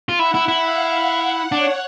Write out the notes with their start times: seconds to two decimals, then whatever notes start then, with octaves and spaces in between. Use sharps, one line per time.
0.09 F4
0.19 E4 F#5
0.34 E4
0.48 E4
0.63 F5
1.07 F#5
1.52 D4 C#5